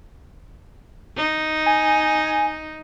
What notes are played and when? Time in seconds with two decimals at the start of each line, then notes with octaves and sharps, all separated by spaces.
1.16 D#4
1.66 G#5